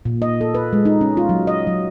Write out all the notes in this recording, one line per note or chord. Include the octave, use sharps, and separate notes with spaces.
A#2
D#5
A4
B4
G#3
D#4
C#4
F4
F#3
D#5
F#3